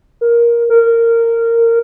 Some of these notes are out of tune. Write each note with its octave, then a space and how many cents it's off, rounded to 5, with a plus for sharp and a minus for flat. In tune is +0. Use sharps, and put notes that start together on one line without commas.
A#4 +15
A#4 -15